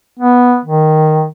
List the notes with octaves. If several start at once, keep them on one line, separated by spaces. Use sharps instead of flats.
B3
D#3